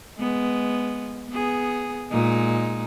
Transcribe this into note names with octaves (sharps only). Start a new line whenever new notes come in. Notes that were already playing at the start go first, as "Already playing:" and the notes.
G#3 B3
B3 G#4
A#2 G#3 D#4